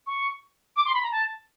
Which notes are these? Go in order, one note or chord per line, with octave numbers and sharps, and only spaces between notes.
C#6
D6
C6
B5
A#5
A5